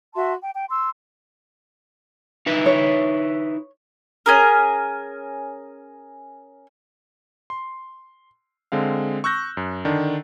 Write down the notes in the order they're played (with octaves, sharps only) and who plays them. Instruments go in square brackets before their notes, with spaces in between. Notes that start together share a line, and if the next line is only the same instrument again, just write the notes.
[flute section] F#4 E5 A5 C6
G5
G5
C6 E6
[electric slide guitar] D#4 E4 B4
[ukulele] C#5
[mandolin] C#4 G#4 A#4
[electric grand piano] C6
D3 G#3 C4 F5
C#6 E6 F#6 G6 A#6
F#2
D3 D#3 D4